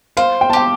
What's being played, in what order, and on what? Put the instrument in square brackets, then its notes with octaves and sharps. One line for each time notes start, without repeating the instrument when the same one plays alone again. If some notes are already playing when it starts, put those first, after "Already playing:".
[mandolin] C5 [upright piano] F5
[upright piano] G5
A5
[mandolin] G4 [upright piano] G5